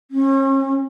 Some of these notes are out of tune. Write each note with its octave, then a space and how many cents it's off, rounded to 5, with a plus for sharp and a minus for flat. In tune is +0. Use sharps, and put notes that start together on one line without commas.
C#4 -40